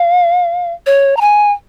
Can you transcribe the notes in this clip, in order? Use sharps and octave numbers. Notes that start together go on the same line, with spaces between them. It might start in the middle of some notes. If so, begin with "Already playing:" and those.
Already playing: F5
C#5
A#5
G#5